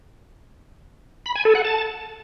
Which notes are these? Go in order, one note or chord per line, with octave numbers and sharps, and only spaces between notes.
B5
G#5
A4
F#5
A5